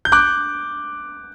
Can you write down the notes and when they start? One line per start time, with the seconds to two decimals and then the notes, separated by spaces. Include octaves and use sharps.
0.05 G6
0.12 D6 F#6